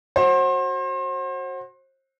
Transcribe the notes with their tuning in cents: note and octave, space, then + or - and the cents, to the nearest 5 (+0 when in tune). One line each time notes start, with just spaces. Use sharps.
F#4 +0 C5 +35